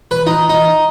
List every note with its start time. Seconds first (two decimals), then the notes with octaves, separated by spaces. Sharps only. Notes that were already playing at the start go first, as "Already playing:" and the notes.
0.11 B4
0.27 D#4
0.49 D#4